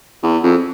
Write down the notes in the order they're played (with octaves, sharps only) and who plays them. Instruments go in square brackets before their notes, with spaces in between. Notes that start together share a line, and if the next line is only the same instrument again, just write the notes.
[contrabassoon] E2
F2